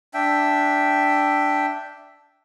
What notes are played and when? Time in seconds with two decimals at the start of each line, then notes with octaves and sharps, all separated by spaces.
0.14 D4 E5 G5